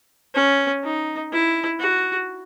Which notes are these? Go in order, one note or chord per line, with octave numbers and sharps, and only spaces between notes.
C#4
D#4
E4
F#4